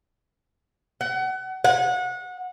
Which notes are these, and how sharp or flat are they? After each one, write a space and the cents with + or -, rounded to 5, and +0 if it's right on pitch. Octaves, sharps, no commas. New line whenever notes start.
F#5 +30
F#5 -25